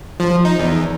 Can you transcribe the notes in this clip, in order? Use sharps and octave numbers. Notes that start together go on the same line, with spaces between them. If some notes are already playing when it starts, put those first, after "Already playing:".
F3
D#4
E2